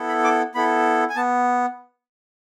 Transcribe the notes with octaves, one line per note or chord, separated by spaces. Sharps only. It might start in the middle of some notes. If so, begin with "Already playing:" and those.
Already playing: B3 E4 A4
B5
D6
B3 E4 A4 B5
G#5
B3 A5